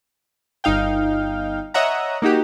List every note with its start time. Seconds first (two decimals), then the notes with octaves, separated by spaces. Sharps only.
0.64 G1 D#4 F5 G5
1.74 C#5 D#5 E5 F#5 A#5
2.22 A#3 D#4 F#4 G4